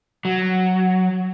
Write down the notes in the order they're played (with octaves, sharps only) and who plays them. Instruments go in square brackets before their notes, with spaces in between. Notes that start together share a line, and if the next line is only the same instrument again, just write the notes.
[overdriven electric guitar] F#3